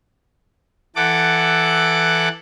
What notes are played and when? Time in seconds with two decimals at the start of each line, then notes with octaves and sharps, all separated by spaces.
0.96 E3 A4 F#5 D6